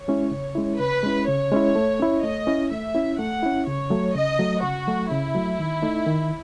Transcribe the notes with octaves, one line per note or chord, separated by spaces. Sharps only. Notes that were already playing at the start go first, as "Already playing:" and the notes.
Already playing: C#5
G#3 C#4 E4
C#3
G#3 C#4 E4
C#3 B4
G#3 C#4 E4
C#3 C#5
G#3 C#4 E4
A3
C#4 E4
A3 D#5
C#4 E4
A3 E5
C#4 E4
A3 F#5
C#4 E4
C#3 C#5
F#3 A3
C#3 D#5
F#3 A3
C#3 F#4
F#3 A3
C#3 E4
F#3 A3
D#3
A3 D#4
D#3